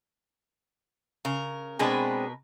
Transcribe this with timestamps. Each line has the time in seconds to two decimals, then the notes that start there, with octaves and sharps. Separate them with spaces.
1.25 C#3 A#4
1.79 B2 G#3 C4 D4 G#4 A#4 B4